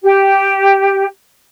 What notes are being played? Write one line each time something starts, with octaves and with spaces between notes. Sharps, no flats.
G4